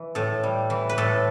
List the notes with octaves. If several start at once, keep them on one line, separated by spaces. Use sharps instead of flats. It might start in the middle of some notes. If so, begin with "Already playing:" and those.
Already playing: E3
A2 A4
G3
E3
B4
A2 A4